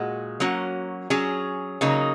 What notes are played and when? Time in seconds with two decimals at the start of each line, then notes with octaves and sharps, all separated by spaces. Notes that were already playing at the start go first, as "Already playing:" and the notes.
Already playing: A#2 G#3 F#4
0.40 F#3 A#3 C#4 F#4
1.10 F#3 C#4 G#4
1.81 C#3 F#3 A#3 D#4